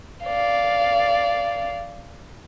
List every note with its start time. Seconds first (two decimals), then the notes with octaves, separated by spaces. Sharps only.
0.24 D5 F5